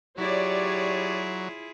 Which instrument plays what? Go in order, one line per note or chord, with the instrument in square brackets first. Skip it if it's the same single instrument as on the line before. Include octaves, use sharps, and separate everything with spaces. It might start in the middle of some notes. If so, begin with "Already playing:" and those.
[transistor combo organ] F#3 [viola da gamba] E4 F4 G#4 [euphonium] G4 [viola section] C#5 D5